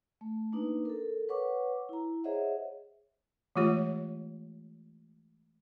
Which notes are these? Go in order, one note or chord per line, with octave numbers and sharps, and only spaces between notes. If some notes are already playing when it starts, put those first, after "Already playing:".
A3
A#3 D4 D#4 B4
A4 A#4
B4 C#5 F#5 C#6 D6
E4 A#5
G#4 C5 C#5 D#5 E5 F#5
E3 G#3 A3 F4 G4 C#5